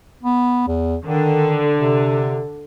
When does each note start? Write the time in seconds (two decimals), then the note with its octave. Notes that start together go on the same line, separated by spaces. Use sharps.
0.23 B3
0.68 E2
1.05 D3 D#3
1.78 C3